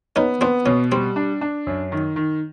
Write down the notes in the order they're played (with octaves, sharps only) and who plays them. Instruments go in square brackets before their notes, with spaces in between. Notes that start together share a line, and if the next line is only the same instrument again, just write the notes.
[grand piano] B3 [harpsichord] C#4 D#4
[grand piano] B3 [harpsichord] C4 D4
[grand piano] B2 [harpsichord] C#4
[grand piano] G3 [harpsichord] C4
[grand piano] D4
D4
F#2
D#3
D#3